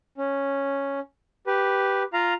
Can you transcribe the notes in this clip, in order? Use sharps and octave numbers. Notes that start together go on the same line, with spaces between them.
C#4
G4 B4
F4 F5 A#5